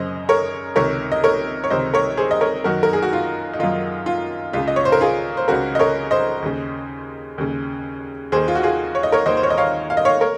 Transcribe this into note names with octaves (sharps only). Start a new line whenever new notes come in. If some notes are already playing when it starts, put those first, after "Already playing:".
Already playing: F#2 C#3 C5 D#5
A#4 C#5
C#2 C3 D#3 A#4 C#5
D#5
A#4 C#5
C#5
C#2 C3 D#3 C5 D#5
A#4 C#5
G#4 C5
D#5
A#4 C#5
F#2 D#3 F#4 A#4
A#4
G#4
F#4
F4
D#4
F#2 D#3 F4
F4
C#2 C#3 F4
D#5
C#5
C5
A#4
F4 G#4
C5
C#2 C#3 F#4 A#4
D#5
A#4 C#5
C5 D#5
D#2 C#3
D#2 C#3
D#2 D#3 G#4 C5
F4
F#4
F4 G#4
C#5
D#5
A#4 C#5
D#2 D#3 C5 D#5
C5
C#5
D#5
C#5 F5
F5
D#5
C#5 F5
A#4 C#5